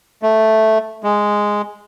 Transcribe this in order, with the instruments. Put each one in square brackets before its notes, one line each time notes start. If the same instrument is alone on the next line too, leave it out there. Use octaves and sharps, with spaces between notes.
[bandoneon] A3
G#3